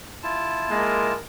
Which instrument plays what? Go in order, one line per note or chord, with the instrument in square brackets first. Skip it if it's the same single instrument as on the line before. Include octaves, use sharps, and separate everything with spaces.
[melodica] E4 F4 A5
[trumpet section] G#3 A#3 A#4